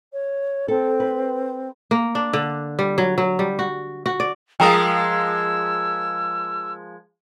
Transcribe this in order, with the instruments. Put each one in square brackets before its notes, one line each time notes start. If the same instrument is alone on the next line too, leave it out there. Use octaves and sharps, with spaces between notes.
[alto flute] C#5
[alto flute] C4 [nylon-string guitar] A4
[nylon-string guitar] B4
[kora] A#3
D4
D3
G3
F#3
F#3
G3
F#4
F#4
D5
[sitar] F3 G#3 A#4 [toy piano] G5 A#5 D#6 [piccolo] E6